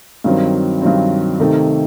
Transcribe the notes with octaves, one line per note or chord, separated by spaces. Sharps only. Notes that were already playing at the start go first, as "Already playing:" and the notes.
G2 D#3 F#3 C4
G2 D#3 F#3 C4
C3 D#3 A3 D#4